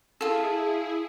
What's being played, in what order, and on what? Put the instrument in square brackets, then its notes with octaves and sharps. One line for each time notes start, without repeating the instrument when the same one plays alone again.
[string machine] E4 G#4 [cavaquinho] F4 A4